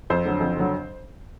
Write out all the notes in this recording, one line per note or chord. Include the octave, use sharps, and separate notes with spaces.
F2 C5
D3 F#3
F2
D3 F#3